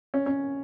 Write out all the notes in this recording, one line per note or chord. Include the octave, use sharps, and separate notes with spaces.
C#4
C#4